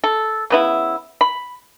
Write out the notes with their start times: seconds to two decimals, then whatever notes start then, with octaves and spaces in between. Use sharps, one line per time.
0.04 A4
0.50 C#3 B3 E4
1.21 B5